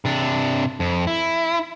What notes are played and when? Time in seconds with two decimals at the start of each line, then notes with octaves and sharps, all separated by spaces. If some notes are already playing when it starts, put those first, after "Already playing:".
0.05 C3 D4
0.80 F2
1.07 E4